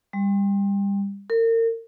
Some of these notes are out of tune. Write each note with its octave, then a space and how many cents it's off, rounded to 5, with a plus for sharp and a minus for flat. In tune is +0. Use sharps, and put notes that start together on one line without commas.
G3 +25
A#4 -35